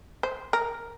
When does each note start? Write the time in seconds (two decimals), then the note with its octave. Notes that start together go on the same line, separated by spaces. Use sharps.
0.23 C5
0.53 A#4